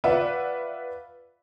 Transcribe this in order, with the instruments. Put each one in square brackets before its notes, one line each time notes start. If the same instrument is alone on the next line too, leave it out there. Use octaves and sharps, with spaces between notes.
[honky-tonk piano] F4 B4 D5 E5 F#5